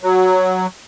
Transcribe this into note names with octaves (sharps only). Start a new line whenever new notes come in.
F#3